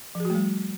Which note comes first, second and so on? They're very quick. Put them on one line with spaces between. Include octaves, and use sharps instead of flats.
F3 G#4 F#4 A3 G3